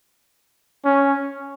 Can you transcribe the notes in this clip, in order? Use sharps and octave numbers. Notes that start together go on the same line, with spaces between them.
C#4